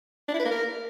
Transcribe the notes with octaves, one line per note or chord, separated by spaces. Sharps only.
D4
E4
B4
A#3
A#4